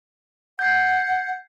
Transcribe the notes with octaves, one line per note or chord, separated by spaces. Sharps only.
F#5 G6 G#6 C7